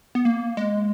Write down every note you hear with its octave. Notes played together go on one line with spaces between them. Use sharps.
B3
A#3
G#3